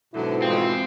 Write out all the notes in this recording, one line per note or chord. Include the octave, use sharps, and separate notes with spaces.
G#2 B2 D3 F#3 E4
E3 G#3 C4 F4